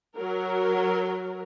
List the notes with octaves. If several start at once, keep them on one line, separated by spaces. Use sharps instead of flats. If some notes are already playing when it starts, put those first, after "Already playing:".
F#3 A#4